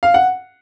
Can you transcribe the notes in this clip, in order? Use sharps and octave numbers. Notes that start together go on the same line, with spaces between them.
F5
F#5